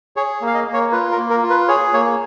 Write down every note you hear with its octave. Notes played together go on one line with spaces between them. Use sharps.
G#4 C#5
A#3
F5
D#5
A#3
C#5
F4 B4
A#4
A#3
A#4
F4
B4
G#4 C#5
A#3 C#5